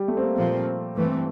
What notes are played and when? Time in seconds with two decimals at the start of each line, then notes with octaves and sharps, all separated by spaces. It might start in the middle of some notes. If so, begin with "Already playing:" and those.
Already playing: G3
0.08 A3
0.17 C4
0.22 A#3
0.36 A#2 F3 A#3 C4
0.94 G2 E3 A3 C4